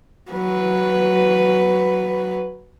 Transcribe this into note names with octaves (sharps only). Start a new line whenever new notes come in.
F#3 B4